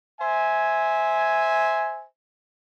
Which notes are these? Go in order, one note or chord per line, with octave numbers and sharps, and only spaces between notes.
C5 E5 G#5